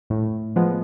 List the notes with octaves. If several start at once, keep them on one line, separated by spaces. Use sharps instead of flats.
A2
F3 G#3 B3